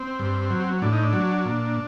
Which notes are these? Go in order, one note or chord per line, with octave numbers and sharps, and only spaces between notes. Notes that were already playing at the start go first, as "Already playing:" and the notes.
Already playing: C4
G2
F#3
A2 D4
D#4
D4
F#3
A#2